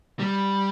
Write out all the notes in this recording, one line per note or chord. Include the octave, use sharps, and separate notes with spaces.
G3